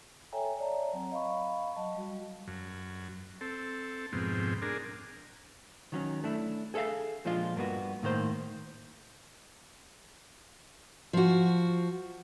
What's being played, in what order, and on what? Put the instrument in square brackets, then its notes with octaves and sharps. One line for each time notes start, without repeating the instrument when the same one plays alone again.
[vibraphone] A4 C#5 E5 G5 G#5 A#5
C#5 D5 E5 A5 A#5
F#3 C4 A#5
D#5 F5 B5 C#6
F#3 D#5 A5
G3 F#4
[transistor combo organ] F#2
C4 A4
F2 G#2 B2 C4
D4 G#4 A#4
[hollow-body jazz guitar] D#3 F#3 C#4
A3 D4 E4
G#4 A4 C5 E5 F5
A#2 F3 G#3 D4 F4
G2 A#3 B3 F#4
A2 D#3 A#3 C5
[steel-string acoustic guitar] F3 F#4